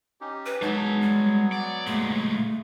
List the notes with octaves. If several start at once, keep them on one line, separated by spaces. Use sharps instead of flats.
C#4 D#4 G4
B4
F#3 G#3 B3 D#4 C#5 A5
G3
D5 F#5
A#2 G#3 A3